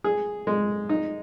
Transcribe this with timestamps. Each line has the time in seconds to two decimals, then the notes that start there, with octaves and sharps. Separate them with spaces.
0.04 G#4
0.47 G#3
0.89 D#4